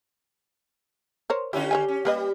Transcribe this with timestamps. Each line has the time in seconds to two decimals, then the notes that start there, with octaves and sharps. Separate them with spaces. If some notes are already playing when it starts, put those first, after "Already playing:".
1.30 A#4 C5 C#5
1.53 D3 C#4 E4 F4 G4
1.71 C#5 E5 G#5
1.88 C#4
2.05 G3 A#3 B4 D#5